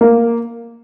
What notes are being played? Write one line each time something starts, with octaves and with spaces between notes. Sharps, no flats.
A#3